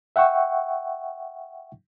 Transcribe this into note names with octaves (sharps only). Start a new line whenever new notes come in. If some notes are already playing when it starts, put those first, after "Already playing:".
E5 F#5 G5 C#6 E6